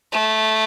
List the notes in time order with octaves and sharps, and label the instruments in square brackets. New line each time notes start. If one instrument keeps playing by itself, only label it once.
[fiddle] A3